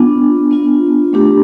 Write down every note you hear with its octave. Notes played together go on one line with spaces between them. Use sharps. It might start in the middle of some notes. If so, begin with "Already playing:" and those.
Already playing: B3 D4 F4
B3 D4 F4
A3 D4 G4